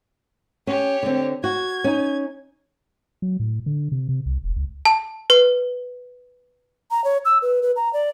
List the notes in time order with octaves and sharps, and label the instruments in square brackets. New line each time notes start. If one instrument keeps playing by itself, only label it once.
[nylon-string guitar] C#4 [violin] G4 C#5
[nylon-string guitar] D3 C4
[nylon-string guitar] F#4 [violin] G#6
[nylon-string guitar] C#4 D#4
[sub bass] F#3
A2
D3
C3
C3
C2
E1
C#2
[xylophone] A5
B4
[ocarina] A#5
C#5
E6
B4
B4
A#5
D5